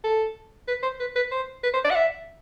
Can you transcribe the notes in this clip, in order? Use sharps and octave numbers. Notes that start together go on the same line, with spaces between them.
A4
B4
C5
B4
B4
C5
B4
C5
D5
F#5
E5